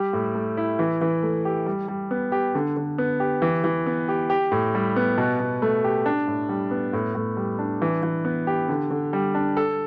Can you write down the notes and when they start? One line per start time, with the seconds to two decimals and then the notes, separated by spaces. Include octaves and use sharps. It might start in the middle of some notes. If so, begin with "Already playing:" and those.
Already playing: G3 G4
0.13 A2
0.35 A3
0.57 E4
0.79 E3
1.01 E3
1.23 A3
1.45 G4
1.66 G3
1.88 G3
2.11 B3
2.32 G4
2.55 D3
2.77 D3
2.98 B3
3.20 G4
3.42 E3
3.64 E3
3.86 B3
4.09 G4
4.30 G4
4.52 A2
4.75 G3
4.96 B3
5.18 B2
5.40 B2
5.62 A3
5.84 G4
6.06 D4
6.27 A2
6.49 G3
6.71 B3
6.93 A2
7.15 A2
7.37 G3
7.59 D4
7.82 E3
8.03 E3
8.25 B3
8.47 G4
8.69 D3
8.91 D3
9.13 G3
9.35 D4
9.57 A4